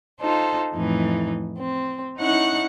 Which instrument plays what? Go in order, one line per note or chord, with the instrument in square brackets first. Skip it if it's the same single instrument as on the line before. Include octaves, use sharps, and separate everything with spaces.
[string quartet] D#4 F4 A4 C5
F2 A2 E3 D#4
C4
C#4 D#4 E4 F#5 C#6 F#6